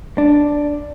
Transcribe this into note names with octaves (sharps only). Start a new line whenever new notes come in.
D4